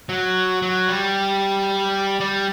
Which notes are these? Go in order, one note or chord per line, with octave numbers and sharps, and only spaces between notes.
F#3
F#3
G3
G3